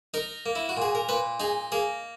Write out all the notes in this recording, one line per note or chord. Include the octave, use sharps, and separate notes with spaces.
D#4 A#4
A#3
E4
F#4
A#2 G#4
A#4
A#2 B4
D#4 G#4
A#3 G#4